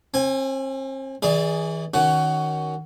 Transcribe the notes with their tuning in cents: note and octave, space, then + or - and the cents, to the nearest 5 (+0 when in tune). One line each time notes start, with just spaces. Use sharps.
C4 +40 G#5 +0
E3 -35 G#4 -5 D5 +0
D#3 +0 C#4 +10 F#4 +15